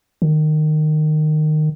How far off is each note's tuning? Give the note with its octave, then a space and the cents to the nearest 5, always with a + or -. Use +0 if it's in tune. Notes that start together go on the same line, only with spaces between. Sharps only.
D#3 -20